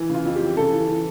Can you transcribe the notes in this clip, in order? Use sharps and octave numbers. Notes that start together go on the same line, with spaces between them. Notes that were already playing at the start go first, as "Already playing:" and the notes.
Already playing: E3
C#3 F4
F2
E3 G4
C#3 A4
E3
E3